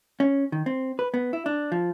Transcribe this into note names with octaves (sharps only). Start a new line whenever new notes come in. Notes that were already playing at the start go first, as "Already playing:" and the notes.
C#4
D#3
C4
B4
B3
E4
D4
F3